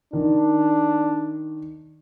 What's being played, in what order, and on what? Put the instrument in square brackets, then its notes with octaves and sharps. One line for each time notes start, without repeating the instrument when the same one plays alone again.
[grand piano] D#3 [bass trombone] D4